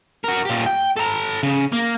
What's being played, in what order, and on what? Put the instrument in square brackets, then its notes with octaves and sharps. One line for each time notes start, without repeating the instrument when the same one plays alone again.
[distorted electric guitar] F#4 A#4
A#2 G4
G5
A4 A#5
C#3
A#3